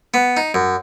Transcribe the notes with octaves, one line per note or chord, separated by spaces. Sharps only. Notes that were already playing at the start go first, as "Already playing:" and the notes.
B3
D#4
F#2